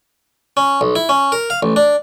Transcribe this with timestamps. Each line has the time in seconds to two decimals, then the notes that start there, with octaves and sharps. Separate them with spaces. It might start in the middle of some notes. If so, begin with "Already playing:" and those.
0.57 C#4
0.81 B1
0.96 E4
1.09 C#4
1.32 A#4
1.50 F5
1.63 A1
1.76 D4